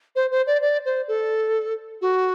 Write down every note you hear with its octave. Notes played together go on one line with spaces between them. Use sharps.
C5
C5
D5
D5
C5
A4
F#4